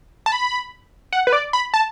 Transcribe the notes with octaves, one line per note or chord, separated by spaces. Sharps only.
A5
B5
F#5
B4
D5
B5
A5